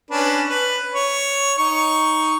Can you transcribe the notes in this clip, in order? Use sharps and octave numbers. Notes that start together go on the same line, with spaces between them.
C#4 D4 B4
B4
C#5
D#4 C#6